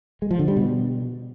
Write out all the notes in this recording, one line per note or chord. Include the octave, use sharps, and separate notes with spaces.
G#3
F3
D3
G3
B2